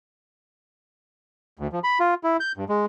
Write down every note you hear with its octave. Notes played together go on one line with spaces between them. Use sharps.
D2
F3
B5
F4
E4
G6
G2
G#3